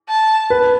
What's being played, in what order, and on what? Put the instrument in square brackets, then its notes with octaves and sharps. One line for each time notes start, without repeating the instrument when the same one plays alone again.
[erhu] A5
[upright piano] B4